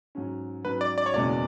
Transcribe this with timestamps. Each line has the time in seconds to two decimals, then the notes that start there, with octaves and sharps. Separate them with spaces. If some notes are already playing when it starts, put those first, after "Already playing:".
0.15 G#2 F#3 C#4
0.65 G#2 F#3 C#4 B4
0.81 D5
0.98 D5
1.06 C#5
1.14 F#1 E2 B2 G#3 C#4 D5